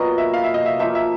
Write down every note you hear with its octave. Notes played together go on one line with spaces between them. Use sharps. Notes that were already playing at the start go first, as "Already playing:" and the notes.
Already playing: A#2 F#3 B3 D#5
E5
F5
E5
D#5
E5
F3 A#3 D#4 G#4 E5
E5